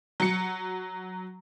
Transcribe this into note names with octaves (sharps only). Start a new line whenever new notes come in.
F#3 C#7